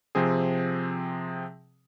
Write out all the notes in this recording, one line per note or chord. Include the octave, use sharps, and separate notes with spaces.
C3 F3 C4 G#4